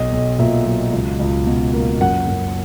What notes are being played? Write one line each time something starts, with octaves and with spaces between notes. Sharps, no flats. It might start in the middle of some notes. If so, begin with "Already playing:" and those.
Already playing: B1 D#5
B1
A#2 E5
F#3
C#2
C#2
B2
A#3
F#2 F#5
F#2